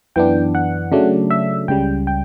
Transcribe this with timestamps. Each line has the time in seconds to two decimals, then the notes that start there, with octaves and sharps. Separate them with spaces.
0.16 F#2 E3 B3 D4 G5
0.55 F#5
0.92 C#3 F#3 A3 D4
1.30 E5
1.68 C#2 C#3 G3 G5
2.07 G5